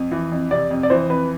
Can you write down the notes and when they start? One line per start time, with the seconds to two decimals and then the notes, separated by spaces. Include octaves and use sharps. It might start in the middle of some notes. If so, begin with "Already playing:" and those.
Already playing: F2
0.11 E3
0.32 F2
0.50 C3 D5
0.71 F2
0.83 D5
0.90 E3 C5
1.10 F2 B4